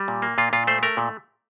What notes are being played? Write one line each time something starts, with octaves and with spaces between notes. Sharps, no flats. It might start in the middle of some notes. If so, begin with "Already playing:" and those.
Already playing: G3
A#2
A#3
A#2 F4
A#2 F4
A3 C5
A3 A#4
A#2